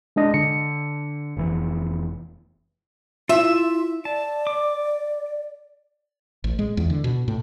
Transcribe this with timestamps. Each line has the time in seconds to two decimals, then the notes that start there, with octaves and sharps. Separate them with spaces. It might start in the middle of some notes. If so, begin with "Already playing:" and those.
0.16 G#3 D4 D#5
0.34 D3 C#7
1.37 F1 E3
3.29 E4 F4 E5 E6
4.05 D5 A5
4.47 D6
6.44 A1
6.59 G#3
6.77 E2
6.90 D3
7.04 B2
7.28 A2